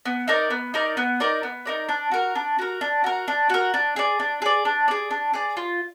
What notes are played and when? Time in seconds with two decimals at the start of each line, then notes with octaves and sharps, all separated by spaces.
0.05 B3
0.28 D#4 A#4 D5
0.50 B3
0.74 D#4 A#4 D5
0.97 B3
1.20 D#4 A#4 D5
1.43 B3
1.65 D#4 A#4 D5
1.89 D4
2.11 F#4 A#4
2.35 D4
2.59 F#4 A#4
2.81 D4
3.04 F#4 A#4
3.28 D4
3.49 F#4 A#4
3.74 D4
3.96 G#4 D5
4.20 D4
4.42 G#4 D5
4.65 D4
4.88 G#4 D5
5.11 D4
5.34 G#4 D5
5.57 F4